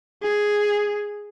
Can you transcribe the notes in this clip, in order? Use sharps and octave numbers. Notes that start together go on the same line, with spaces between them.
G#4